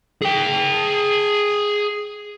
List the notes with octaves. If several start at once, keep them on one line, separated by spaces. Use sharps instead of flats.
G#4 G5